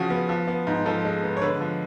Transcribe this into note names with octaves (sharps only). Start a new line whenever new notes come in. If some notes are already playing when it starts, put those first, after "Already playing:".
Already playing: C#3 F3 F#4
B3
F3
B3
G#2
F3 A4
G#3
B3
C#5
D3 B4
F3